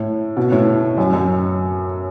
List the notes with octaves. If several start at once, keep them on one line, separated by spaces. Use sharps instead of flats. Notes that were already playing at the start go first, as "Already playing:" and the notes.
Already playing: A2
B2
A2
F#2
F#2